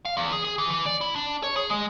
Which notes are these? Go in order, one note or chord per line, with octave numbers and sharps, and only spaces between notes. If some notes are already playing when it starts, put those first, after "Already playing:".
F5
E2
G#4
G#4
E3
E3
D5
E4
D4
C#5
G#4
G#3